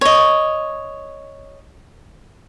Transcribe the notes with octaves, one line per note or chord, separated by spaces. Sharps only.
C#5 D#5